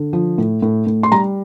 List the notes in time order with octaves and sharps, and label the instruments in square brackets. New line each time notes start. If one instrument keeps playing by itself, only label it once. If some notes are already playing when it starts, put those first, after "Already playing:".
Already playing: [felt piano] D3
F3
A2
A2
A2
C6
G3 A#5